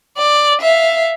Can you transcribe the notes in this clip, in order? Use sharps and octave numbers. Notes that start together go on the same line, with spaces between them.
D5
E5 F5